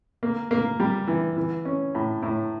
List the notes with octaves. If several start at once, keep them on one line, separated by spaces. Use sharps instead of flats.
A#3
A#3
G3
E3
E3
C#4
A2
A2